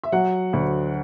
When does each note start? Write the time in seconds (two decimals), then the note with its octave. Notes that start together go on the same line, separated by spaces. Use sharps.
0.04 E5
0.12 F#3 F#5
0.53 D2